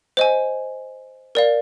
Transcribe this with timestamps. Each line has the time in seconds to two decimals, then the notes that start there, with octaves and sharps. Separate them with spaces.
0.17 C5 D#5 G#5
1.35 A#4 D5 F5